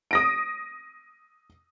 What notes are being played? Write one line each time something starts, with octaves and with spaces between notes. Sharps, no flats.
D#6 A#6 D7